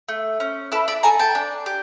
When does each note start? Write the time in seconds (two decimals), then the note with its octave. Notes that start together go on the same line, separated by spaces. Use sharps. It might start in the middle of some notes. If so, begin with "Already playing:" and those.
0.09 A3
0.40 C#4
0.72 E4 A4 B4
0.88 D5 E5
1.03 A4 G#5 A#5
1.19 G5 A5
1.35 D4
1.66 G4